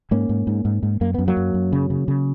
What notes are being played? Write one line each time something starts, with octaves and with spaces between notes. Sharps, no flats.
G#2 A#3 C#4
G#2
G#2
G#2
G#2
F#2 A#3
F#2 B3
F#3 A#3
F#2
F#2
C#3
C#3
C#3